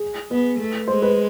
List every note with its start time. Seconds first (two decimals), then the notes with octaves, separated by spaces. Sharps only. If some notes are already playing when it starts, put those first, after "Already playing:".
Already playing: G#4
0.31 B3 B4
0.59 A3
0.88 G#3 C5
1.02 B4